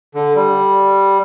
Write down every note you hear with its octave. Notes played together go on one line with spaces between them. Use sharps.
D3
G3